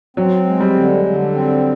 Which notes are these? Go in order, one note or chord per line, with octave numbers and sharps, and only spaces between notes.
F#3 C4
G#3
G3
D3
D3
C4